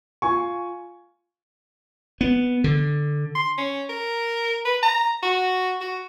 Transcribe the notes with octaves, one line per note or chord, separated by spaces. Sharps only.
F4 G#5 C#6
B3
D3
C6
C#4
A#4
B4
A#5
F#4
F#4